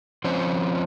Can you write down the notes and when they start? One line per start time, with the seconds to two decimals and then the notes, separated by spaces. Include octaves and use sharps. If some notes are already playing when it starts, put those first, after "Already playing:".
0.24 F3 C4 C#4 C5